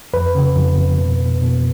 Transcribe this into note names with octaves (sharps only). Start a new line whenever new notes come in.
F2 B4
C#3
F2
F2
B2
B2
B2